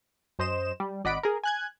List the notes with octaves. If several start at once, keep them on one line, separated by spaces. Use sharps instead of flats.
F#2 C5 D#5 E7
G3
G#1 D5 D#5 F#5 B5 D7
G#4 A#4
G#5 F#6 G#6